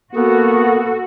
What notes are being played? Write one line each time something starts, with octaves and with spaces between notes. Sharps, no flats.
A#3 B3 F#4 A4